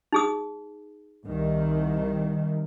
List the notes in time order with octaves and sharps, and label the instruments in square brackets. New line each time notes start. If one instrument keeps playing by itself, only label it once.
[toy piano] D#4 G#4 D#6
[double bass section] C2 D#3